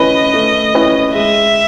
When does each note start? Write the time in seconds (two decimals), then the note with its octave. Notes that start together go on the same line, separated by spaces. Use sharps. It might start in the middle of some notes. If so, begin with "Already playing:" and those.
Already playing: A3 C#4 E4 B4 D#5
0.33 A3
0.74 C#4 E4 B4
1.15 G#3 E5